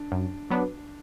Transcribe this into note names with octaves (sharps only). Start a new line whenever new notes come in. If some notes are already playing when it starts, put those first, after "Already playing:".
Already playing: D4
F#2
F#3 B3 D4